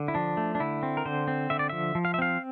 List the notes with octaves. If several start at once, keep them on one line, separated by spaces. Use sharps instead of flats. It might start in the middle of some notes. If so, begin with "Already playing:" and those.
Already playing: D3
E4
F3 D4
A3
D4
D3 E4
C4
A#4
D3 C5
C4
D3 E5
D5
F3 E5
F3
F5
E5
C4 F5